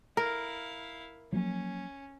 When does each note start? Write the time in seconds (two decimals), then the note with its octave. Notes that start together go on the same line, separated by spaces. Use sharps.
0.17 E4 A#4 F5
1.32 F3 F#3 A#3 C#4